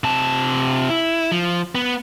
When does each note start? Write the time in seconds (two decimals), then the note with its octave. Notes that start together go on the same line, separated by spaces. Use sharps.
0.04 C3 A5
0.90 E4
1.32 F3
1.75 B3